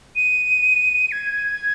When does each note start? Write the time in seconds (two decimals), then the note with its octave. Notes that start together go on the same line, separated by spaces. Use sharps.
0.16 D#7
1.12 G#6